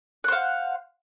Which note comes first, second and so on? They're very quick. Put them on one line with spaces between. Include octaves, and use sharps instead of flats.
F#5 C5 F5